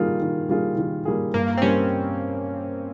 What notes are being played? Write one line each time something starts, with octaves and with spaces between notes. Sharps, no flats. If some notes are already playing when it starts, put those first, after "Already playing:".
Already playing: D#3 G3 A#3 F4 G#4
D#3
G3 A#3 F4 G#4
D#3
G3 A#3 F4 G#4
G2 A#3
C4
G3 A#3 C#4